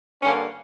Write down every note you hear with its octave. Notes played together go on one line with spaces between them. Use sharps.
G2 D3 A#3 C#4